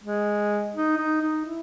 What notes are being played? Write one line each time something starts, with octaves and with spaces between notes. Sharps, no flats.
G#3
D#4
D#4
D#4
E4